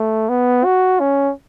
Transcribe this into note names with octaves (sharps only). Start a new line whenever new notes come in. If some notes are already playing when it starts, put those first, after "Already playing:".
Already playing: A3
B3
F#4
C#4